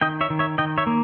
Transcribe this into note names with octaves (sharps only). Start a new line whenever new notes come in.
D#3 D#5 G5
C#5 E5
D#3
C#5 E5
D#3 D#5 G5
C#5 E5
A#3